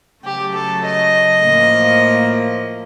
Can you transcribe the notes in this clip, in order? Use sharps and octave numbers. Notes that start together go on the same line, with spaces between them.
C#3 F#3 A3 G4
A4
D#5
A2 F3 A#3